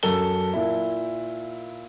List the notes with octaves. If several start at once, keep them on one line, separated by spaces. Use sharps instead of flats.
F#2 A4 G7
A#2 E4